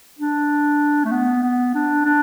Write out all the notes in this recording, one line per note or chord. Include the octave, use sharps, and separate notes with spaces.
D4
A3
B3
B3
D4
D4